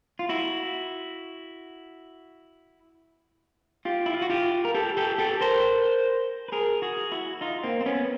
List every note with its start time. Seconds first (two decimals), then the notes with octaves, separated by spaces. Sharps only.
0.19 F4
0.29 E4 F#4
3.85 F4 G4
4.06 E4
4.14 F4
4.22 F#4
4.30 F4 G4
4.65 A#4
4.74 G4 A4
4.97 G4 A4
5.18 G4 A4
5.41 A#4 C5
6.48 B4
6.52 G#4 A#4
6.82 F#4 G#4
7.12 E4 F#4
7.41 D#4 F4
7.64 A#3 C4
7.81 C4
7.86 B3 C#4